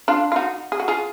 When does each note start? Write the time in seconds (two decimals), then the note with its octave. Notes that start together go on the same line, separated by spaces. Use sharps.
0.08 D4 F4
0.32 F4
0.36 D#4 F#4
0.72 G#4
0.80 F#4
0.88 F4 G#4